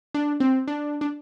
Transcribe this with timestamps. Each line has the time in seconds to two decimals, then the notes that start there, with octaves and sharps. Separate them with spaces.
0.14 D4
0.40 C4
0.68 D4
1.01 D4